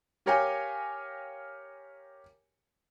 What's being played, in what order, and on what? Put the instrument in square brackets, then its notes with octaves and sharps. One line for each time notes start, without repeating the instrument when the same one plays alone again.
[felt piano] G4 A#4 C#5 F5 G5 G#5